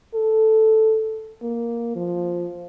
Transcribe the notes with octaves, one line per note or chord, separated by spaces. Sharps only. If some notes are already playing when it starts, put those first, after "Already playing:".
A4
A#3
F3